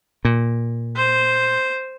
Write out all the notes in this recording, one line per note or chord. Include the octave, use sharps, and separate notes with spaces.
A#2
C5